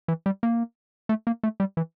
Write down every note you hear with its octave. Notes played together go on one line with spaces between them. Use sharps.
E3
G3
A#3
A3
A#3
A3
G3
E3